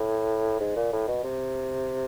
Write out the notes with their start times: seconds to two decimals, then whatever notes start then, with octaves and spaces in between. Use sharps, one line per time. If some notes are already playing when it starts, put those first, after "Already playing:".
Already playing: A2
0.60 G#2
0.76 A#2
0.92 A2
1.08 B2
1.24 C3